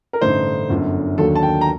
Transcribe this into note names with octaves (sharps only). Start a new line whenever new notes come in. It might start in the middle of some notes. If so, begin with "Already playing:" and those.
A#4
A1 G2 D3 A3 D#4 C5
G1 F#2 D3
D#2 D3 F#3 A#3 A4
A5
G5
A#5